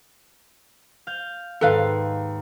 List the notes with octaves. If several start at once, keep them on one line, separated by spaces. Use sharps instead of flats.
F5 G6
D#2 G#2 A4 B4 F5